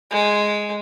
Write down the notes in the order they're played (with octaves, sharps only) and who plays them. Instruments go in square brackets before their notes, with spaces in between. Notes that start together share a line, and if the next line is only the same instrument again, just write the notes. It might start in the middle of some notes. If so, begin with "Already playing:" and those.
[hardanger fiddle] G#3